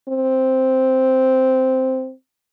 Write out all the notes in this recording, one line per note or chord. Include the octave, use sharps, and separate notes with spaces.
C4